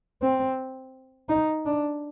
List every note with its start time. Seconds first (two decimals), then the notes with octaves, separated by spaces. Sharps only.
0.22 C4
1.29 D#4
1.66 D4